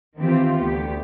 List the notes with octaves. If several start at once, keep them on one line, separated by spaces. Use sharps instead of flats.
D#3 E3 C4 F4 G4
D2 B3 G4